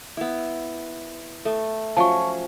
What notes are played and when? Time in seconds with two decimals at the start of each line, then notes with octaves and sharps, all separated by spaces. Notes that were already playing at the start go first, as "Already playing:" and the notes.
0.17 B3 E4
1.45 A3 A4
1.97 F3 F#3 C#4 A5 C#6